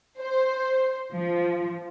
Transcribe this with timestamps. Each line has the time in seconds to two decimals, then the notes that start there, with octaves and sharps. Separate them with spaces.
0.20 C5
1.14 F3